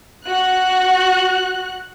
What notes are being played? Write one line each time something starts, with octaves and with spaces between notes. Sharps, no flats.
F#4 F#6